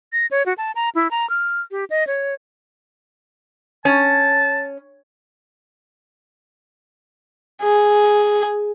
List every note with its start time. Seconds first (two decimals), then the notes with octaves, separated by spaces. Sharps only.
0.13 A#6
0.31 C#5
0.46 F#4
0.58 A5
0.75 A#5
0.95 E4
1.11 A#5
1.30 F6
1.71 G4
1.90 D#5
2.07 C#5
3.85 C#4 A5
7.62 G#4